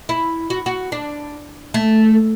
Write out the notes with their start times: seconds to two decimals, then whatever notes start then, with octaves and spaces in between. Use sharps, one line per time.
0.09 E4
0.50 F#4
0.66 F#4
0.92 D4
1.74 A3